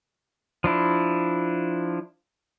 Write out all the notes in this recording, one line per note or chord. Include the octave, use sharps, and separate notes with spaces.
F3 D4 E4